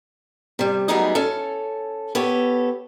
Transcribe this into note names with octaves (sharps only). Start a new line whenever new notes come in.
C3 G3
F#3 G3 A3 B3 D#4 G#4
C#4 A4
B3 G4 A4 C#5